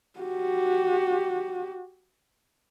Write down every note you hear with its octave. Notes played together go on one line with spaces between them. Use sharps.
F#4 G4